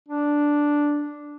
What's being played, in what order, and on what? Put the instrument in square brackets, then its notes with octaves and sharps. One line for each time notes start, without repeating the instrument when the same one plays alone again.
[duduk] D4